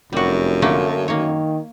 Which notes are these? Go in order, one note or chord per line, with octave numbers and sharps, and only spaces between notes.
F1 F#2 G3 F#4
D3 A3 A#3
D#3 A#3 C#5